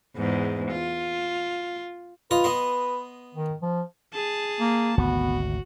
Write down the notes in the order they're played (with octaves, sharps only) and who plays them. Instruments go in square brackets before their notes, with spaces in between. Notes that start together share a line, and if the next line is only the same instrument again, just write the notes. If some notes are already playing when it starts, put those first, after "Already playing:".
[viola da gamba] E2 G#2
F4
[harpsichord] F4 D#5 D#6 [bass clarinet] B4
[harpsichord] B3 D#5 C6
[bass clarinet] D#3
F3
[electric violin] G#4 A5
[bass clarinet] A#3
[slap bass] G#1 D2 C3 [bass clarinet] B3 [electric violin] F#4